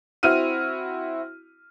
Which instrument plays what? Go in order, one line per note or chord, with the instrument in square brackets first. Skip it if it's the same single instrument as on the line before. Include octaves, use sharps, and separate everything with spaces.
[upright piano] C4 E4 F#4 F6 D#7